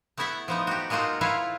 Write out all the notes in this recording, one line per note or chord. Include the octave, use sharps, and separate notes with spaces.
A3 B3 E4 A4 E5 F#5
F3 B3 D#4
F#4 G4
G#3 A#3 D#4 F4 F#4 A4
E4 F4 A4 B4 C#5 F5